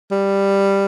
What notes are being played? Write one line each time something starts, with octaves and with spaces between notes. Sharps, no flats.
G3